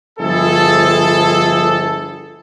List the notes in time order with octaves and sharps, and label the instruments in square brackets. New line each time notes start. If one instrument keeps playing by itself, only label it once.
[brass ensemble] G1 F3 E4 G#4 A4